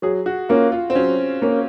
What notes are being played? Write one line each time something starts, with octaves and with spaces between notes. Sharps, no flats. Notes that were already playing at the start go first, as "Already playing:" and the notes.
F#3 G#4
F#4
A#3 C#4 F4
F4
C4
F#3 C#4
A#3 C#4